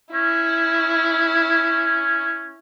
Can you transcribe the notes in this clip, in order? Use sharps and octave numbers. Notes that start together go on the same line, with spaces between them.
C#4 E4